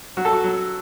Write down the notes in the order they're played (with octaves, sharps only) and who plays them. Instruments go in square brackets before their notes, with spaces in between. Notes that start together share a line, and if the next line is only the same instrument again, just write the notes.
[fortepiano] F#3 F#4
A4
F#4
F#3